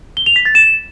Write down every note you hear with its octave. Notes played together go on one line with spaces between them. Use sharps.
G7
F7
B6
A6
E7